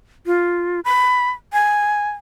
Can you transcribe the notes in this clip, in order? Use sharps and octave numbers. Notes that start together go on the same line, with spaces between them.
F4
B5
G#5